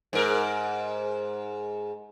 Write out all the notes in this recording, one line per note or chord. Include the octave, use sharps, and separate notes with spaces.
G#2 A#4